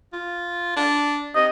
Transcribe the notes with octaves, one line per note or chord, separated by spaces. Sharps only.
F4
D4
C3 D#5